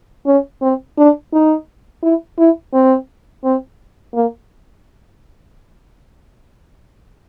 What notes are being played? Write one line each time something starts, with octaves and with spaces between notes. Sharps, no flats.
C#4
C4
D4
D#4
E4
E4
C4
C4
A#3